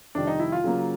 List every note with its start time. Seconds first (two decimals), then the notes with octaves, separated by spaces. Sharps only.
0.15 F2 C3 D#3 G3 D4
0.27 D#4
0.39 E4
0.52 F4
0.64 C#3 F#3 A#3